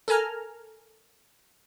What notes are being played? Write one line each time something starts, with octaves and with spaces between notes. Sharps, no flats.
A4 A#4 G#5 A#5 F6